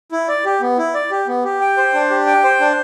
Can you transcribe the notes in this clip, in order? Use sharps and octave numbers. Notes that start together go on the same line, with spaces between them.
E4
D5
G4
B3
E4
D5
G4
B3
G4
G5
C5
D4
G4
G5
C5
D4